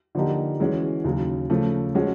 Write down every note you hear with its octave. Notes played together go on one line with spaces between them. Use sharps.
D3 F3 A#3 D#4 G4
E3 G#3 C#4 F#4
D#2 C#3 F#3
C#3 F3 A3
F3 G#3 C#4 F#4